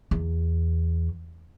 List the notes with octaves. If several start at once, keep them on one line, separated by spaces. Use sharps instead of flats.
E2